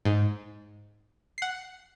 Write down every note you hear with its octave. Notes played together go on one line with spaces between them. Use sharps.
G#2
F#5 C7